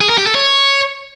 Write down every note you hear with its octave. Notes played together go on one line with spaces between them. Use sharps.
G#4
A#4
G4
A4
C#5